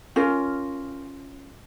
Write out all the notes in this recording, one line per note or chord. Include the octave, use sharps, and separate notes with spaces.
C#4 F4 A#4